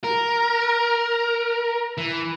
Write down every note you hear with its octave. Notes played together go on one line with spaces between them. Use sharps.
A#4
E3